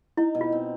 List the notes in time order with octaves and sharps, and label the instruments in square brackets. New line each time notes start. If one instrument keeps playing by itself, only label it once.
[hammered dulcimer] D#4 [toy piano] E4
[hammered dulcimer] B2
[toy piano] F4
[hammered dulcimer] C4